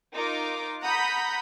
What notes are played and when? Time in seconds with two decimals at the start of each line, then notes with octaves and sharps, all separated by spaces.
0.15 D#4 F4 A#4 D6
0.83 F#5 A#5 B5 D#6 G6 B6